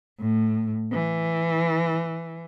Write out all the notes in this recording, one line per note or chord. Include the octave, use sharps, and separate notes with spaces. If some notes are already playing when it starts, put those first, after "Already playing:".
A2
E3